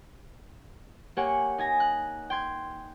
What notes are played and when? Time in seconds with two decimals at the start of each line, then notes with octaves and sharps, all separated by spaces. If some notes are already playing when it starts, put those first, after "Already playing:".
1.17 A#3 G4 C#5 F#5 G#5
1.58 D#4 G#5 A#6
1.80 F#6
2.30 G5 C6 G#6